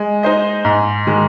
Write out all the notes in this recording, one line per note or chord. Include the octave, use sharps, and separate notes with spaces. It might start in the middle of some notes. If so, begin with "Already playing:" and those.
Already playing: G#3
D#4 C5 D#5
G#2
D#3 G#3